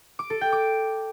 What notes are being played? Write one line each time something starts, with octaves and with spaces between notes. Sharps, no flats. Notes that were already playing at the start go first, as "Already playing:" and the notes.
D6
A4
G5
D6